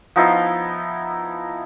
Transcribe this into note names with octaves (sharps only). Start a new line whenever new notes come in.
F3 B3 D#4 E4